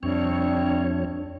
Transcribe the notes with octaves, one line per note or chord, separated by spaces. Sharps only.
F2 C3 G3 C4 D4 C#5